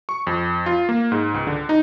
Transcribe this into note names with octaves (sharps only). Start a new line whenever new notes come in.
C#6
F2
F4
A#3
G#2
C#2
D3
D#4